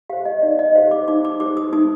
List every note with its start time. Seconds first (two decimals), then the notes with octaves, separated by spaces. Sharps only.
0.10 G4 C5 F5
0.25 D#5
0.42 D#4 D5
0.59 D#5
0.75 G4 C5 F5
0.91 D6
1.08 D#4 D6
1.25 D6
1.40 G4 C5 D6
1.57 D#6
1.73 D#4 D#6